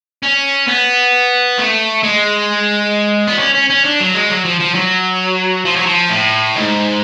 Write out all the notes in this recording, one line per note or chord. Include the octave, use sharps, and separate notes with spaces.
C#4
B3
A3
G#3
B3
C#4
C#4
C#4
D4
F#3
G#3
F#3
F3
F3
F#3
F3
F#3
F3
A2
G#2